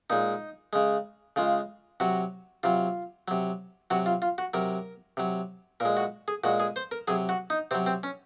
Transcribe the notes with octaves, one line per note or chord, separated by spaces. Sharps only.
A#2 G#3 D#4
C#3 G#3
C#3 G#3 F4
C3 F#3 F#4
C3 F#3 F4
C3 F#3
C3 F#3 F#4
F4
F4
F#4
C3 F#3 A#4
C3 F#3
A#2 G#3 A#4
F#4
G#4
A#2 G#3 F#4
G#4
C5
A#4
C3 F#3 G#4
F#4
D#4
C3 F#3 C4
C4
C#4